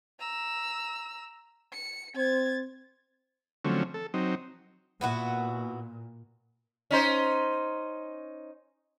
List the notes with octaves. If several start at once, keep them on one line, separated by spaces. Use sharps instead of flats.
A#5 E6
C#7
C4 C5 G#6 A6
D3 F3 F#3 A3 C4 C#4
A4
F#3 C4 D#4
A#2 B3 E4 F#4
C#4 D#4 C5